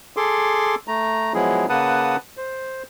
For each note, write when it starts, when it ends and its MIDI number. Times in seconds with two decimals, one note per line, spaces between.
0.17 0.75 68
0.17 0.75 69
0.17 0.75 84
0.17 0.75 86
0.88 1.33 57
0.88 1.33 82
1.34 1.66 53
1.34 1.66 54
1.34 1.66 56
1.34 1.66 59
1.34 1.66 64
1.34 1.66 68
1.69 2.17 49
1.69 2.17 58
1.69 2.17 71
1.69 2.17 78
1.69 2.17 81
1.69 2.17 87
2.37 2.83 72